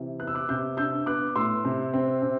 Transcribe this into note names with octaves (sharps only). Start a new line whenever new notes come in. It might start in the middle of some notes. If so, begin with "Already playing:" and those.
Already playing: C3 E3
B3 F#6
E6
D6 F#6
C3 E6 G6
D4 E6 G6
B3 D6 F#6
A2 C6 E6
C3
C4
C3